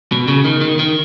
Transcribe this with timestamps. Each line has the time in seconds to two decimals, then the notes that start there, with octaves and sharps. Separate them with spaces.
0.12 B2
0.28 C#3
0.45 D#3
0.61 D#3
0.79 D#3